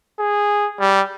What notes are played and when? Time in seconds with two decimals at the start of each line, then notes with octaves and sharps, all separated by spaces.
0.19 G#4
0.80 G3